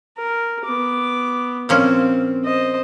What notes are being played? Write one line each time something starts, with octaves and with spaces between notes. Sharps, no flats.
A#4
B3 D6
A#2 F3 C4 C#4
C5 D#5